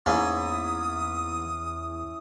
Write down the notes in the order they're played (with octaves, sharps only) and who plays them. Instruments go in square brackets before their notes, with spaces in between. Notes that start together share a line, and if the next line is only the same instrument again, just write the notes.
[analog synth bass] E2 [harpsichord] G#2 A#3 [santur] C#4 E4 [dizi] D#6